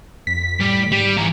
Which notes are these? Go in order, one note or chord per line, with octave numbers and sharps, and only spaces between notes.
F2 B6
A2 G3
G#2 G3
E3 A#5